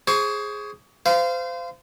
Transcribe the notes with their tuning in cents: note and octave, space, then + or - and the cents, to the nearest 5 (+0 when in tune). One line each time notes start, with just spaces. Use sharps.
G#4 +0 C5 +15 C#6 +35
C5 -30 F5 -20